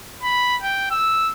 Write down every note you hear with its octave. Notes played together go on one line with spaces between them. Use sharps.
B5
G5
E6